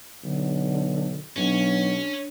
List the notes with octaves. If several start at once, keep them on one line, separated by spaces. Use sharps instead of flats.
B1 D3
B1 C#4 D4